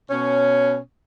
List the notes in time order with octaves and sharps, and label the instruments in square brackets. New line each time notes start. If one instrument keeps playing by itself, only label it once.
[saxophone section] B2 C#4